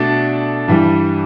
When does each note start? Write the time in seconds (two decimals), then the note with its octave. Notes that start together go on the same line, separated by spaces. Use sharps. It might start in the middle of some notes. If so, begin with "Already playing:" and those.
Already playing: B2 A3 D4 A4 D5
0.68 G2 E3 G3